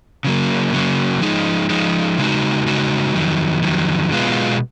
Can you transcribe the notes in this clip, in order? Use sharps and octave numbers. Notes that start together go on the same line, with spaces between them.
C#3 F#3 A#3
C#3 F#3 A#3
F3 G#3 D#4
F3 G#3 D#4
C#3 G#3 D#4 F#4
C#3 G#3 D#4 F#4
F2 D#3 F#3
F2 D#3 F#3
B2 G#3 B3 F4